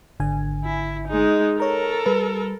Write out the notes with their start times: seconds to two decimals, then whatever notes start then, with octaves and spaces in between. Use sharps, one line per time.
0.20 G#1 D3 G#5
0.64 E4
1.08 G#3 D#4
1.60 A4 A#4 C#5 A#5
2.06 G3 B4